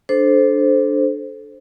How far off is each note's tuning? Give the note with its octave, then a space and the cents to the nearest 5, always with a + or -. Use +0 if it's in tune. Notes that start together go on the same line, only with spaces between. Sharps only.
D4 +5 A4 -20 C5 +0